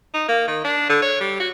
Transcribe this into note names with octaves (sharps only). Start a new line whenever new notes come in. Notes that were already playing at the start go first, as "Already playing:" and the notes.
D#4
A#3
D#3
D4
D3
C#5
G3
F#4